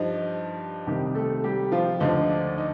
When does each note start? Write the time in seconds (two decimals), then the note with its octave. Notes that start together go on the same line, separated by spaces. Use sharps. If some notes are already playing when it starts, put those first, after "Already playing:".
Already playing: G2 F3 D#4
0.87 C2 C3 D#3 G3 G4
1.15 A3 A4
1.44 G3 G4
1.72 F3 F4
2.00 D2 D3 F3 D#4
2.29 D4
2.58 D#4